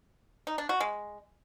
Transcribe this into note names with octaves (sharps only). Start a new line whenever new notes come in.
D#4
D4
F#4
G#3